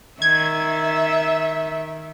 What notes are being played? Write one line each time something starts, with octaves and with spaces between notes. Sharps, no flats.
D#3 E5 G#6